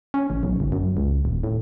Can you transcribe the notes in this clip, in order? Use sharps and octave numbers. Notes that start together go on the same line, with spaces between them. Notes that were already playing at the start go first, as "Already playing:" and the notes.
C#4
A1
B1
G1
F#2
C#2
D#1
A2